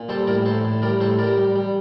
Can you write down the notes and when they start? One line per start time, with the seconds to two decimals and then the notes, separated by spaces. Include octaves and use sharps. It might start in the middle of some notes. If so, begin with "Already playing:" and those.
Already playing: A#2
0.09 G3 A4 C5
0.27 A2 A#4 D5
0.45 A2 A4 C5
0.65 A2
0.82 G3 A#4 D5
1.00 A2 A4 C5
1.19 G3 A#4 D5
1.37 G3
1.56 G3